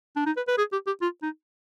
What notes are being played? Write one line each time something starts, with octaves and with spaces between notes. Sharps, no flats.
D4
D#4
B4
B4
G#4
G4
G4
F4
D#4